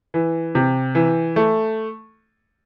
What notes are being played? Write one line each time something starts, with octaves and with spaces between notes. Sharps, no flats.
E3
C3
E3
A3